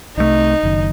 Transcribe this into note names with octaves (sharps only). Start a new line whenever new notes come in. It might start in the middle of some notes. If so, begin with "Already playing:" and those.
C2 C3 D#3 A3 D#4
F#1 F#2 D#3